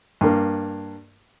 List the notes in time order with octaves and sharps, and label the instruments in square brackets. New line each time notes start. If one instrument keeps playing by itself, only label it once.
[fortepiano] G2 A#3